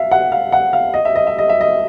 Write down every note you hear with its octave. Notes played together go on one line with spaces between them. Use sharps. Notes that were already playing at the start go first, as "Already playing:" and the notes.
Already playing: E5 F5
F#5
F5
F#5
F5
D#5
E5
D#5
E5
D#5
E5
D#5